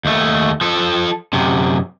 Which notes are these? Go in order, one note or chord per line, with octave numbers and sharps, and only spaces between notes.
D#2 A3
F3 A4
F#2 C3